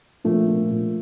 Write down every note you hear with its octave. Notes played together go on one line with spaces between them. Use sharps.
A#2 F3 A3
A#2
A#2